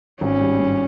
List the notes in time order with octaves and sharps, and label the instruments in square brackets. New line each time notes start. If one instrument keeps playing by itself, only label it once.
[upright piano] G#1 [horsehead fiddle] C#4
[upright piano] G3
G2